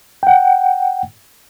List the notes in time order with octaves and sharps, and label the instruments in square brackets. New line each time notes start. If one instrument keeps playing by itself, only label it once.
[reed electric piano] F#5 G5